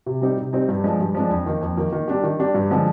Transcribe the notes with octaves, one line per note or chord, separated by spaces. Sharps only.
C3
G3 C4 D#4 G4
C3
G3 C4 D#4 G4
G2
F3 G#3 D4
G2
F3 G#3 D4
F2
D#3 A#3
F2
D#3 A#3
D#3
G3 D4 G4
D#3
G3 D4 G4
G2
D3 F3 G#3